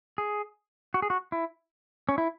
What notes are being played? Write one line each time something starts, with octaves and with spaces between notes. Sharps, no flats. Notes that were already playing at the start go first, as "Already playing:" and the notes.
G#4
F#4
G#4
F#4
E4
C#4
E4